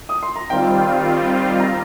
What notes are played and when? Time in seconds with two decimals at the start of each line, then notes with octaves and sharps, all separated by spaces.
0.09 D#6
0.23 C6
0.36 A#5
0.50 D#3 G3 C4 F4 G5
1.60 A#5